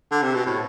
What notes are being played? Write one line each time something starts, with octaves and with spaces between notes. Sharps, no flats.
D3
C3
B2
A2